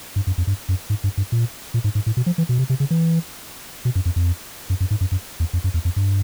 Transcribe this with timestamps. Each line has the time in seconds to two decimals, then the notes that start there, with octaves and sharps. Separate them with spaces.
0.16 G2
0.27 F#2
0.38 F2
0.47 G2
0.69 F#2
0.90 G#2
1.04 G2
1.17 G2
1.32 A#2
1.74 A#2
1.84 G#2
1.95 G#2
2.06 A2
2.17 B2
2.26 F3
2.38 E3
2.49 B2
2.59 C3
2.70 C3
2.80 C#3
2.91 E3
3.85 B2
3.95 F#2
4.05 F2
4.16 F2
4.70 F#2
4.80 F#2
4.91 G#2
5.01 F#2
5.12 F#2
5.40 E2
5.53 F2
5.64 F#2
5.74 E2
5.85 F2
5.96 G2